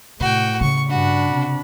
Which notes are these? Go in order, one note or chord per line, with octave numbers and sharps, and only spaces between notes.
A2 C3 F#4 G5
C#3 C#6
G2 D4 F#4 B5
C3